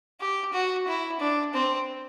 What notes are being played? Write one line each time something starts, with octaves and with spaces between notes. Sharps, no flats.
G4
F#4
E4
D4
C4